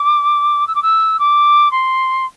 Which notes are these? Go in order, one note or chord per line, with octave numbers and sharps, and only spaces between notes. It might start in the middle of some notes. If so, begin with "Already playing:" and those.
Already playing: D6
E6
D6
E6
D6
C6